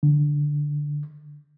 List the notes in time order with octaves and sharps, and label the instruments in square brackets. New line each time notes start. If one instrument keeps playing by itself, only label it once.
[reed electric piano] D3